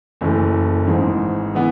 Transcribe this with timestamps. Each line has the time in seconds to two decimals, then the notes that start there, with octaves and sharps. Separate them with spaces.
0.21 F#1 F#2 E3 A3
0.87 G#1 G#2 E3
1.55 E3 B3